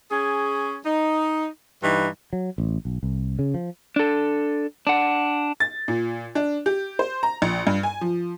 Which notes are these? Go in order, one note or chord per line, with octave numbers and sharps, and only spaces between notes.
C#4 G#4
D#4
G2 E3 D#4
F#3
A1
B1
C2
C#3
F3
D4 A4
D4 F#5
A6
A#2
D4
G4
C5
A#5
A#1
G2
G#5
F3